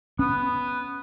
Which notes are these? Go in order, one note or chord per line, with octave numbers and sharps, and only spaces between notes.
B3 C#4